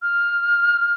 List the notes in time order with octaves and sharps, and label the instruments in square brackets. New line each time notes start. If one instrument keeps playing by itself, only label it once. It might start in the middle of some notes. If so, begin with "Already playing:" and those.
[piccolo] F6